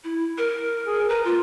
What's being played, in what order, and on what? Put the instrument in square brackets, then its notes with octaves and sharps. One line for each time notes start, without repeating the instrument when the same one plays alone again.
[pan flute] E4
A#4
[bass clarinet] G#4
[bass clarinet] A#4 [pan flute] B4
[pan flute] F4